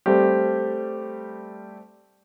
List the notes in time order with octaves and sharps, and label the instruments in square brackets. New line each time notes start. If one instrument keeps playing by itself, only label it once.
[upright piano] G3 A3 C4 G4